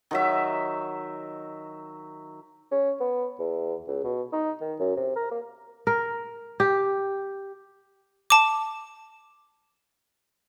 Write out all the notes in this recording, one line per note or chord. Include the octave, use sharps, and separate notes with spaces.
D#3 F#3 E5
C#4
B3
E2
C#2
B2
D#4
D#3
F#2
C3
A#4
A#3
A#4
G4
A5 D6